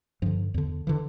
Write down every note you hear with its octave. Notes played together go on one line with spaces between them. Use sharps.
G2 D3 F3
E2 D3
D3 E3